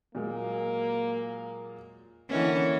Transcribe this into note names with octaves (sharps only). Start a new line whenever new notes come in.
A#2 F#3 G#3 A#3
D3 E3 A#3 C#4 D#5 F#5